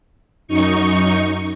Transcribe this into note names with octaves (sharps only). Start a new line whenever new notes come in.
F#2 D#4 C#6